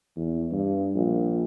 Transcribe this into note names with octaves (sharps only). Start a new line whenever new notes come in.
E2
G2
A#1